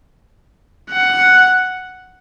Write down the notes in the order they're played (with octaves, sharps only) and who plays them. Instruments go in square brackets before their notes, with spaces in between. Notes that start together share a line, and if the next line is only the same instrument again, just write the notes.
[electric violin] F#5